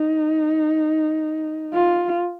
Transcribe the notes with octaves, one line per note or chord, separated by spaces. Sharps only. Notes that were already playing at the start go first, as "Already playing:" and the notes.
Already playing: D#4
F4